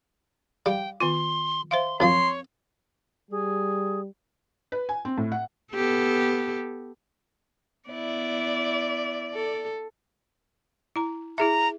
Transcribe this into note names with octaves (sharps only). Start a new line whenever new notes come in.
G3 F5 G5
D#3 B3 F4 C6
C5 E5 F5 C6
F#2 F3 C4 C#5 C6
G3 G#4
B4
G#5
C4
A2
F#5
B3 G4 A4
B3 E4 D5
A4
E4 A#5
E4 G#4 E5 A#5